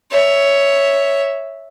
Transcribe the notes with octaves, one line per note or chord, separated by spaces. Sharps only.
C#5 E5